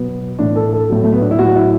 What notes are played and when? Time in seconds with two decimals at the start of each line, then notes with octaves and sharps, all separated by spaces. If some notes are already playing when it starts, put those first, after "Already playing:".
Already playing: B2 F#3 B3
0.39 A2 E3 D4
0.56 A4
0.73 A4
0.89 A2 F#3
1.04 A3
1.12 B3
1.22 D4
1.31 E4
1.39 A2 F#3 F#4
1.56 E4